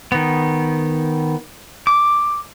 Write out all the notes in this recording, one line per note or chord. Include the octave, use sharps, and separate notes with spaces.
D#3 B3
D6